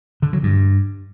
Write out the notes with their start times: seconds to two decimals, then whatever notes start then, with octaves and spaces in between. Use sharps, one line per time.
0.22 D3
0.33 F#3
0.43 G2